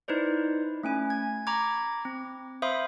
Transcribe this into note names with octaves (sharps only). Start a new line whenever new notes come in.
D#4 E4 B4 C5 D5
A3 C#4 G#5
G#6
A#5 B5 C#6 D6 G#6
C4
C5 E5 F5 B5 C6 D#6